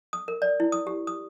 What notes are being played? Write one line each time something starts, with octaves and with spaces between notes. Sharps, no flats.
D#6
A#4
D5
E4
D#6
G4
D#6